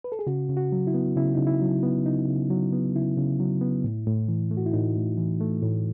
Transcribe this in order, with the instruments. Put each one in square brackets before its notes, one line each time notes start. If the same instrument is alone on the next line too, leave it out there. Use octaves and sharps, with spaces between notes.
[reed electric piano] B4
A4
G#4
C#3 F#4
C#3
F#4
F#3
E4
B3
C#3 E4
C#3 D#4
E4
F#3
B3
C#3 D#4
C#3
F#3
B3
C#3 E4
C#3
F#3
B3
A2
A2
E3
A3
F#4
E4
A2 D#4
A2
E3
A3
A2